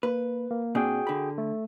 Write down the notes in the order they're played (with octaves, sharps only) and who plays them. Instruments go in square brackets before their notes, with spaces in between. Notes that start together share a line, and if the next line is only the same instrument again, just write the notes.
[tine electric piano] A#3 [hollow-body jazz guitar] B4
[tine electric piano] A#3
[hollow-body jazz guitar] A#2 C4 D4 [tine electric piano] F#4 G#4 G5
[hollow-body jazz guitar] D3 B5
[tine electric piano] A3